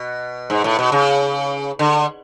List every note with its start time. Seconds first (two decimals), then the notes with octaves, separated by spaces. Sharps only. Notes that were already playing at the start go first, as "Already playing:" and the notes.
Already playing: B2
0.50 G#2
0.64 A2
0.79 B2
0.92 C#3
1.79 D3